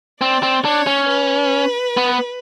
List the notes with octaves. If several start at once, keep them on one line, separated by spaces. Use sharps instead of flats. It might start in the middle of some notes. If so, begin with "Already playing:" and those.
C4 D5
C4
D4 C#5
C#4
B4
B3